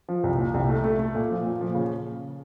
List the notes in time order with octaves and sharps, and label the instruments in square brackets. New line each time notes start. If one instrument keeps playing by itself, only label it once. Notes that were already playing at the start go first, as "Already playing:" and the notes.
[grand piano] F3
C2
A#2
C2
A3
A3
A3
A#2
F3
A#2
F3
C#3